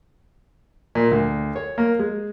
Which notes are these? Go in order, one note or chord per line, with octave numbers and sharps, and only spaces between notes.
A#2
D2
C#5
A#3
G#3